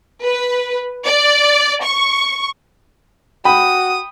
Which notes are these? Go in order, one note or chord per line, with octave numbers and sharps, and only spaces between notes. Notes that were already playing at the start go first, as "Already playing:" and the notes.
B4
D5
C#6
F#4 G5 B5 D#6